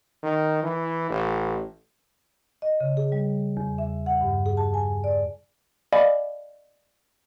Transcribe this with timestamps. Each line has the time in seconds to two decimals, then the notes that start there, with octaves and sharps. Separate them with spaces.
0.23 D#3
0.63 E3
1.10 A1
2.62 D#5
2.81 C#3
2.97 G#4
3.12 G3
3.57 E2
3.78 E5
4.06 F#5
4.21 G2
4.46 G#4
4.57 A5
4.74 G#5
5.04 D5
5.92 D5 D#5 F5 G#5 B5